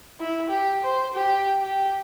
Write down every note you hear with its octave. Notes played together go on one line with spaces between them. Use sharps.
E4
G4
C5
G4
G4